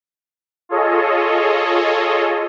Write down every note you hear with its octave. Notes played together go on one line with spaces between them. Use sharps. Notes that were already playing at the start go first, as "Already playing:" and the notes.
F4 G#4 A4 C#5 D#5